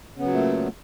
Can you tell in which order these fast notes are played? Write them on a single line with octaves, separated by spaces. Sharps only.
C#3 B3 F#3 A#2 A3